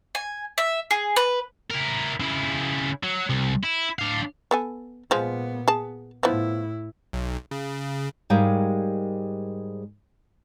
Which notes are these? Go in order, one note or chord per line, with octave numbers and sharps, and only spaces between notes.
G#5
E5
G#4
B4
E4 A#4
C#3 E4
F#3
C2
E4
D4 F5
B3 A4 G#5
A#2 F3 G#3 B3
G#4 A5
A2 F3 B3 E4
B1
C#3
G#2 G3 G#3 G4 A#4 F5